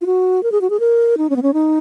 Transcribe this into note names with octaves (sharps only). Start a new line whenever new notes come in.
F4
F#4
A#4
G#4
F#4
G#4
A#4
D#4
C#4
B3
C#4
D#4